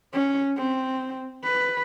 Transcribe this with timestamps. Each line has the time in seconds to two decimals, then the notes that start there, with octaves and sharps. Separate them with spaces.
0.13 C#4
0.57 C4
1.44 B4